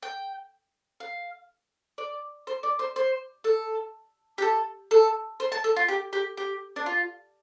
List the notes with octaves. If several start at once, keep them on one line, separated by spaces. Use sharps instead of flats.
G5
F5
D5
C5
D5
C5
C5
A4
G4
A4
A4
C5
A5
A4
F4
G4
G4
G4
D4
F4